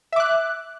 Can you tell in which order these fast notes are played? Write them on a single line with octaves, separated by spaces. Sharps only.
E5 D6 F#6